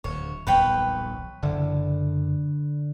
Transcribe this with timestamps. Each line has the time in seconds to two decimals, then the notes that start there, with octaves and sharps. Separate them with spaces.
0.04 D1 D2 C#5
0.47 D#1 B1 F2 B4 C#5 G5
1.42 F#1 D3